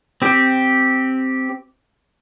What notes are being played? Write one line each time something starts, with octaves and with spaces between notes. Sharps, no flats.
C4 G4